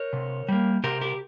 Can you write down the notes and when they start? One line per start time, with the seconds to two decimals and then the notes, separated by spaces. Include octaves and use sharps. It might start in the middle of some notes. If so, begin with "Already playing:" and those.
Already playing: A#4 C#5
0.13 C3
0.49 G3 A#3
0.84 C3 G4 A#4
1.01 G4 A#4